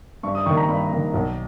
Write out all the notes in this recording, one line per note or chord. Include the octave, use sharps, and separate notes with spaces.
G2 C#6
D#6
D#3 A#3 C#6
A#5
G2 B5
D#3 A#3
B1